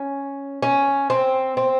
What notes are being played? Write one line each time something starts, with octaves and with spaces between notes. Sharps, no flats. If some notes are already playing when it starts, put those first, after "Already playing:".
Already playing: C#4
C#4
C4
C4